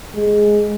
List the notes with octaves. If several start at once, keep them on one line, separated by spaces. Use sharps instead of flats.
G#3